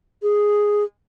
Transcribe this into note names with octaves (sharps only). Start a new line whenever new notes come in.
G#4